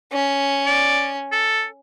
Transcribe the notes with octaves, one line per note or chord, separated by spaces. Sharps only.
C#4
D5
A4